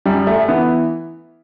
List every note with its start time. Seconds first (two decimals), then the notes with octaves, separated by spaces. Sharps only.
0.05 F#2 G3
0.27 A3
0.48 E3 B3